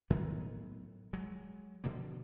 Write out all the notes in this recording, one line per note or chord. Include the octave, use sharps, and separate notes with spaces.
A2 D#3 F#3 B3
F#3 G#3
B2 D3 F3 A#3